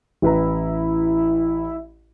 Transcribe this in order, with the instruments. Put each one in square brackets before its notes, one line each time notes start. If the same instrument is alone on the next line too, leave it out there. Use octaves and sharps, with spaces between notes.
[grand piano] A1 B4 A#5 [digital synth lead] E4